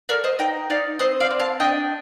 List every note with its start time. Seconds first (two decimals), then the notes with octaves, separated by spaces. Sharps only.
0.09 A4 A#4 D5
0.24 C5 D#5
0.39 D#4 D#5 G5
0.70 D#4 D5 F5
0.99 C4 C5 D#5
1.20 D5 F5
1.31 C4
1.40 F5 A5
1.60 D4 D#5 G5